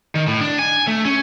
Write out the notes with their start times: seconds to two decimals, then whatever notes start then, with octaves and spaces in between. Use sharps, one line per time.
0.15 D#3
0.28 A2
0.41 D4
0.59 G#5
0.87 A3
1.05 C#4